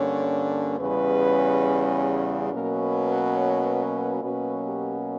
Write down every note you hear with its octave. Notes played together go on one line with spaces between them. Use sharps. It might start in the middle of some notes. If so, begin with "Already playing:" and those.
Already playing: G2 D3 A#3 C#4 C#5
E2 C#3 G3 C#4 B4
B2 F#3 A#3 C#4 A#4
B4
B4
C#5
B4
B4
B2 F#3 A#3 C#4 B4
G4